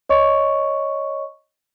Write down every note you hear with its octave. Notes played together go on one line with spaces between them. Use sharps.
C#5 D#5 C#6